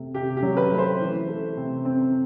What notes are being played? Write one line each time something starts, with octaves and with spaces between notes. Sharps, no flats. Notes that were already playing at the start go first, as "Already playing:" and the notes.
Already playing: C3 A3
C3 G4
G4
F#3
B4
A3
C5
E3
A3
C3
C4